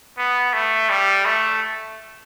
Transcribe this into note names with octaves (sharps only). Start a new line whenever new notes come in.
B3
A3
G3
A3